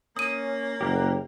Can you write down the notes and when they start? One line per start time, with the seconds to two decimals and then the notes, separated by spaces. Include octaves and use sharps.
0.16 A#3 C#4 D#6 D#7
0.81 F#1 G4 A#4 F#5